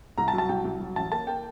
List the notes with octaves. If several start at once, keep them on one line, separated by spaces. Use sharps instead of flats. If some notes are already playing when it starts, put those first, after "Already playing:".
C2 A#5
A5
F#3
A5
C2 G5
C2
F#3
A1 A5
A#3 A5
A#3 G5